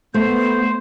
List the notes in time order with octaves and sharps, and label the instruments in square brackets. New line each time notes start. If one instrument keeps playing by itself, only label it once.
[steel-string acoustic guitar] A3 [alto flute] B3 [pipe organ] C5